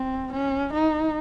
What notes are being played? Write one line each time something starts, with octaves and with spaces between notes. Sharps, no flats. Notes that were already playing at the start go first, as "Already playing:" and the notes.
Already playing: C4
C#4
D#4